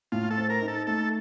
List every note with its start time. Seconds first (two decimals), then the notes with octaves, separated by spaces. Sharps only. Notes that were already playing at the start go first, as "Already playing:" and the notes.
0.12 A2 F4
0.31 A4
0.38 C4
0.50 A#4
0.62 D#4
0.68 A4
0.87 A3 A4